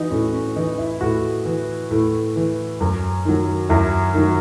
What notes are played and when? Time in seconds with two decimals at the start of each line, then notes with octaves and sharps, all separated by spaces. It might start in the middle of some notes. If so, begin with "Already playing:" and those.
Already playing: E3 D#4 F#4
0.11 A2 C#4
0.34 C#4
0.56 E3 D#4
0.78 E4
1.01 A2 F#4
1.45 E3
1.91 A2
2.36 E3
2.80 F#2
3.25 D#3 F#3
3.69 F#2 E4
4.14 D#3 F#3